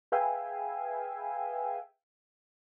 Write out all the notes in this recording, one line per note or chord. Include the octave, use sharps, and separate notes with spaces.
G#4 B4 E5 F5 G5 G#5